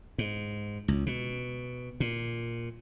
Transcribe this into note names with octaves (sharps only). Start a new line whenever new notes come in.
G#2
C#2
B2
A#2